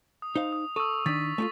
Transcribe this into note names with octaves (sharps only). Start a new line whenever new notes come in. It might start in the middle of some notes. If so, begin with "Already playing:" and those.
D#6
D#4 C5 F5
D#6
A4 C#6 D#6 E6
D#3 D4 A6 B6
A3 E4 F4